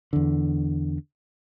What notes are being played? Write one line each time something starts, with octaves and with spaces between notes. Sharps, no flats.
E2 D3